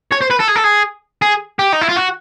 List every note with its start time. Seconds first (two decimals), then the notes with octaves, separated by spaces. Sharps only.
0.11 C#5
0.21 C5
0.30 B4
0.39 A4
0.48 G#4
0.55 A4
0.64 G#4
1.22 G#4
1.59 G4
1.73 D#4
1.81 E4
1.89 F4
1.96 F#4